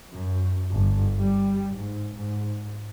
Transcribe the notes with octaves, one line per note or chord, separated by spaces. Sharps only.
F#2
G1
G3
G#2
G#2